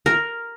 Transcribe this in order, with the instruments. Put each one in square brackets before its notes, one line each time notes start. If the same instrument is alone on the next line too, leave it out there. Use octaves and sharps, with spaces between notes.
[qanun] A#4